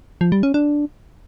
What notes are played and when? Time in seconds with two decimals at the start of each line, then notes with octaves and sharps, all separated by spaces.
0.21 F3
0.32 G3
0.43 C#4
0.54 D4